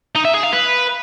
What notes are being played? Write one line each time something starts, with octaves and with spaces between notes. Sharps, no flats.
D#4
E5
G#4
F5
B4